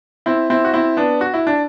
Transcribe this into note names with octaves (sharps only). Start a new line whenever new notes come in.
C4 E4
C4 E4
F#4
C4 E4
B3 D4
F#4
E4
D4